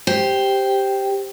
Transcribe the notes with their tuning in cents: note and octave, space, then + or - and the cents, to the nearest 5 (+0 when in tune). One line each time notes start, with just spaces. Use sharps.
G4 +0 C5 +0